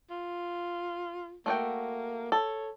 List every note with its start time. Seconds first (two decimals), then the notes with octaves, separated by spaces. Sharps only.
0.10 F4
1.46 A3 A#3 F#4 G5
2.32 A4 C#5